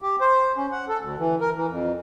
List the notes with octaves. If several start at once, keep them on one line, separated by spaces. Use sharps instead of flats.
G4
C5
C#4
F#5
A4
D2
E3
A#4
E3
F2